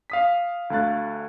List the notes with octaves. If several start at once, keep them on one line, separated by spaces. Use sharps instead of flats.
F5 D#6 B6
D2 A3 F5 F#6 A6